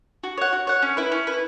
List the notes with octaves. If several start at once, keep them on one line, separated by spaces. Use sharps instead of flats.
F#4
C#5 F#5
F#4
C#5 F#5
C#4
E4 B4
C#4
E4 B4